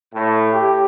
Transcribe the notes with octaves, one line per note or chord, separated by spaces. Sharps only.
A2
G4